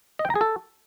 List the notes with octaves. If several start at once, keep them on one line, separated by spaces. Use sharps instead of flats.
D#5
G5
A#5
G#4
A4